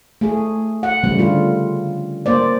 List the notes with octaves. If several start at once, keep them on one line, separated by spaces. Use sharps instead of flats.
A3 G#4
F#5
C#3 F3 G3 A3
D3 F4
A#3 C5 D5